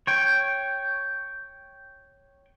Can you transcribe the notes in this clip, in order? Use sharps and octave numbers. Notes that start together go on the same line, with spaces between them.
C#5 G5